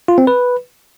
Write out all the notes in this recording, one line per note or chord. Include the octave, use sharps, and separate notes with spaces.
F4
C4
B4